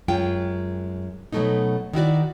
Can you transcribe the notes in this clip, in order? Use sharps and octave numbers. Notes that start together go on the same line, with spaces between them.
F#2 G#3 F4 G5
B2 F#3 G3 A3 B3 D#4
D#3 E4 F#4 D5